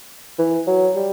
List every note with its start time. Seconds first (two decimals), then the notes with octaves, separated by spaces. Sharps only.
0.39 E3
0.67 F#3
0.96 G3